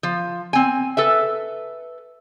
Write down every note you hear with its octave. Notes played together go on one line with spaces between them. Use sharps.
F3
C4 G#5
A4 B4 E5